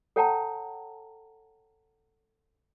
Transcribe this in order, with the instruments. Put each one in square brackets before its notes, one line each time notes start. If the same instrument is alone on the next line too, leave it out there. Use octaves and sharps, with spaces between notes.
[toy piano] A4 C#5 F#5 G5 A5 A#5